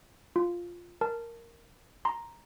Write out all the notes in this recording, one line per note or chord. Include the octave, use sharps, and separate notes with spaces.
F4
A#4 A5
A#5 C6